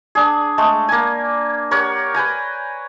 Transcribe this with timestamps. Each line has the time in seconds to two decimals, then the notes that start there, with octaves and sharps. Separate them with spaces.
0.15 D4 G#4
0.58 G#3 A3 A4
0.89 A#3 G#5
1.71 G4 A#4 C#5 F#5
2.14 B4 G5 G#5 A#5